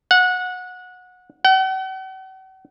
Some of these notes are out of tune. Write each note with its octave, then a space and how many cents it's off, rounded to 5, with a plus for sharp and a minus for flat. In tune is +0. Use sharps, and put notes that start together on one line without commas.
F#5 -20
F#5 +45